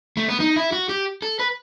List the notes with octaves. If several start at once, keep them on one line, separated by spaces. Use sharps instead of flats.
A3
B3
D#4
E4
F#4
G4
A4
B4